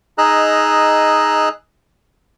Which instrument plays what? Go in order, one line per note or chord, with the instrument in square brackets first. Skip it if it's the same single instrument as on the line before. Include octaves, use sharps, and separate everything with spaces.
[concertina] D#4 G#4 D#5 A#5 E6 F#6